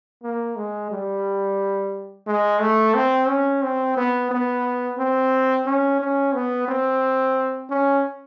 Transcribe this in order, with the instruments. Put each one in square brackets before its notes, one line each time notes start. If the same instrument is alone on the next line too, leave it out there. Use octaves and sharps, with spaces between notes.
[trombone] A#3
G#3
G3
G#3
A3
C4
C#4
C4
B3
B3
C4
C#4
C#4
B3
C4
C#4